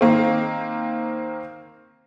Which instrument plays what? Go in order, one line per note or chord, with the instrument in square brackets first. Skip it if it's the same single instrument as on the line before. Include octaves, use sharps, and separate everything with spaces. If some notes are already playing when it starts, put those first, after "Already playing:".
[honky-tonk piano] D#3 A#3 C4